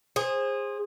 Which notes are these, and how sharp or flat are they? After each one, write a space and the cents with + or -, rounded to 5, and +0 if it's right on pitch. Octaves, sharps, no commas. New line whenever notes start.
G#4 -20 C5 +20